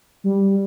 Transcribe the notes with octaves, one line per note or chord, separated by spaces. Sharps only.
G3